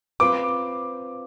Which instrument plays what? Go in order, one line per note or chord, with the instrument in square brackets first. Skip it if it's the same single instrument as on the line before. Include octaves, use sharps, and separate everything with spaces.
[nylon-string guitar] C4 F4 B4 [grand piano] D6